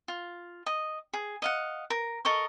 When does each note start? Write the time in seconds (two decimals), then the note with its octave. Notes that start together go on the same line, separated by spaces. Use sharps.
0.08 F4
0.66 D#5
1.13 G#4
1.42 D#5 F5 F#5
1.90 A#4
2.25 A4 A#4 D#5 C#6